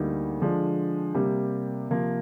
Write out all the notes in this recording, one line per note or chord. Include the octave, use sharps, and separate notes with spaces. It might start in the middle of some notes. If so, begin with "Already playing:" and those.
Already playing: D2 D3 G3 A#3 D#4
D3 F3 G#3 D4
C3 G3 A#3
C3 F3 A#3